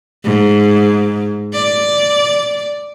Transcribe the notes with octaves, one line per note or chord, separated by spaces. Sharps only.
G#2
D5